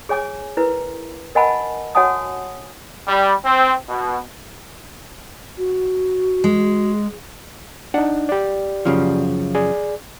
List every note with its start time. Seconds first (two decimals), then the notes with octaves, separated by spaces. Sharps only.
0.09 G#4 C#5 G#5 D6
0.57 E4 A#4 B4
1.35 A#4 D#5 F#5 G#5 A5 B5
1.95 F#4 C#5 F#5 G#5 A5 D#6
3.07 G3
3.45 C4
3.88 B2
5.58 F#4
6.44 G#3
7.94 D4 D#4 F#5
8.29 G4 D5
8.85 F#2 C#3 F3
9.55 G#4 D5